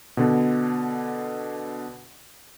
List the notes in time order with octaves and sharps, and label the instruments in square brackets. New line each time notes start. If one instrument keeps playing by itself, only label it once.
[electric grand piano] B2 D3